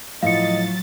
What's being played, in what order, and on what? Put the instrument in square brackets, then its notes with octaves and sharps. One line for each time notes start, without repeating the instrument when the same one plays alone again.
[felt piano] A2 F3 [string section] F#3 A6 [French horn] D#5 [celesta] F5 C#7